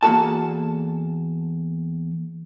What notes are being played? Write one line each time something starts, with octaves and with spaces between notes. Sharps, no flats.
E2 A#3 D4 F#4 A4 A5